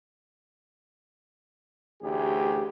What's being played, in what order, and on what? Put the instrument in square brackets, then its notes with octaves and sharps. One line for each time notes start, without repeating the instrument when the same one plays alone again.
[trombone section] A1 D2 G4 G#4